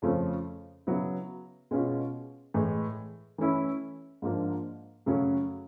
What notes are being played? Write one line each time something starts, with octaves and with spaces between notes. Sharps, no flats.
F2 C#3 F3 A3 C#4
C#3 F#3 B3 E4
B2 G#3 C#4 F4
A2 E3 G#3
E3 A3 C#4 E4
G#2 F3 A#3 D4
F#2 C#3 F#3 A3 C#4